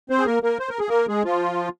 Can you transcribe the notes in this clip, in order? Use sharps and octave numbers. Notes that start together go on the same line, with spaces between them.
C4 C5
G#4
A#3 A#4
A#3 A#4
C5
A#4
G#4
A#3 A#4
G#3 G#4
F3 F4